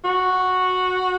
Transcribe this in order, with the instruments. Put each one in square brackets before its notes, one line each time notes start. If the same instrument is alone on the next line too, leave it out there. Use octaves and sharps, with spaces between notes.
[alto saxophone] F#4